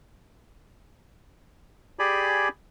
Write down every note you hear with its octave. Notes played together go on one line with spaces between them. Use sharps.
G4 G#4 D5 G#5 B5